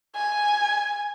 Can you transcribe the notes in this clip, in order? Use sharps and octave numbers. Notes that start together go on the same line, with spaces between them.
G#5